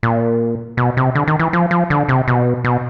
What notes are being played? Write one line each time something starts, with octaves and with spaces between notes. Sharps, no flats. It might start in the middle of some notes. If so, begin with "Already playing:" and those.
A#2
B2
C3
D3
D#3
E3
F3
F3
D3
C3
B2
B2